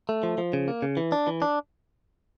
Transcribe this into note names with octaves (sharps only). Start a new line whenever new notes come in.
A3
F3
F3
C#3
A#3
C#3
E3
D4
E3
D4